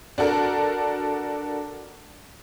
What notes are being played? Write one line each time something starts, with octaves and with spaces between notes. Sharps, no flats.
D4 F#4 A4 A#4